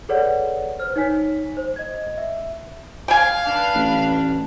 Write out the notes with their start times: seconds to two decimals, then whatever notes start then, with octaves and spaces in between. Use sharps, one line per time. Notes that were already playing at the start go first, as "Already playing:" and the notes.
0.09 G#4 A4 B4 C#5 D5 F#5
0.79 B4 C5 F6
0.96 D#4 C#5 G#5 B6
1.57 C5
1.76 D#5 G#6
2.18 E5
3.08 F5 G5 G#5
3.43 D4 B4
3.75 A1